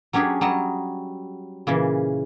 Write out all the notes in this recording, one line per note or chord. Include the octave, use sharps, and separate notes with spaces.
F#3 C#4 D4 G4 G#4
F#3 G3 D#5 A5
A#2 C#3 E3